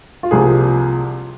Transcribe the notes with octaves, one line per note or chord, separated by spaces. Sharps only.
F4
C2 C3 F3 A#3 G#4